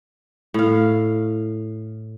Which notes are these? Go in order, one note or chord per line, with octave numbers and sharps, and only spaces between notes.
A2 F5